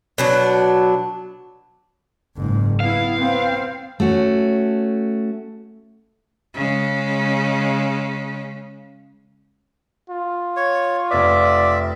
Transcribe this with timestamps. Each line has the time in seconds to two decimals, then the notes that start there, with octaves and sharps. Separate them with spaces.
0.18 B2 F#3 D4
2.37 F#1 G#2
2.80 B3 E4 F5
3.18 B3 C4
4.00 A3 C#4 F#4
6.54 C#3 G#3
10.10 F4
10.57 C#5
11.11 F1 B4 D5 E5